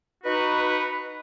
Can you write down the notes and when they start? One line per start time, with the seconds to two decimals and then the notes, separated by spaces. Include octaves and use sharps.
0.24 D#4 F#4 B4